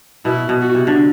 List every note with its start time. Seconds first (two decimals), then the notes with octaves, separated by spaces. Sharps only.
0.25 B2 E4
0.49 B2
0.61 F#4
0.74 C3
0.87 D3